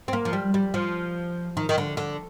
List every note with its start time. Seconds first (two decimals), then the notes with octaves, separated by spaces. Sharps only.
0.08 C4
0.13 A#3
0.25 F3
0.33 G3
0.54 G3
0.74 F3
1.57 D#3
1.69 D#3
1.78 D3
1.97 D3